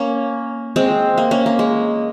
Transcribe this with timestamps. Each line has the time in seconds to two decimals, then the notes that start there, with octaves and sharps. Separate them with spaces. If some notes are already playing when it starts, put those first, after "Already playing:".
Already playing: A#3 C#4
0.76 G#3 C4
1.18 A#3
1.31 A#3 C#4
1.46 A#3
1.59 G#3